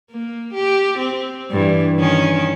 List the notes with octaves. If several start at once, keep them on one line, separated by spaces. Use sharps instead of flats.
A#3
G4
C4
G2 E3
D#3 C#4